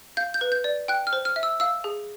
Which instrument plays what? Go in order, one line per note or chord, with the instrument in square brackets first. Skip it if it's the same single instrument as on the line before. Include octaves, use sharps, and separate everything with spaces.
[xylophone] F5 G6
G6
B4
G6
D5
G5 F#6
F6
C5
F6
E5
E6
F5 E6
G#4